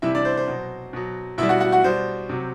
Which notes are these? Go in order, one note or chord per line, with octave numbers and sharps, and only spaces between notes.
C3 E3 G3 E4 E5
D4 D5
C5
C5
B2 F#3
B2 F#3
B2 G3 E4 E5
F#4 F#5
F#4 F#5
F#4 F#5
B2 G3 C5
C3 F#3